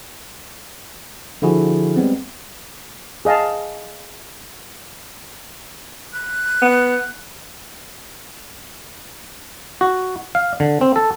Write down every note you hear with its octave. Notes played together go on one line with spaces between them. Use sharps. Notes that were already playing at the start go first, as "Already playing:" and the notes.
D3 F3 E4 F#4 G#4
G3 G#3 B3 C4
G#4 D#5 F5 A5
F#6
B3
F#4
F5
D3
C4
A4